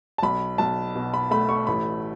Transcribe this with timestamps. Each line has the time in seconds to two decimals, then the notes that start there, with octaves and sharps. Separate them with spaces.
0.18 A5
0.23 B1 B5
0.58 B1 A5
0.95 B2
1.14 B5
1.31 A3 B5
1.49 C#6
1.67 A1 B5